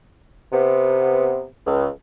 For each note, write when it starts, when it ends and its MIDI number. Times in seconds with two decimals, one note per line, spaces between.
0.52 1.45 48
0.52 1.45 59
1.67 1.88 37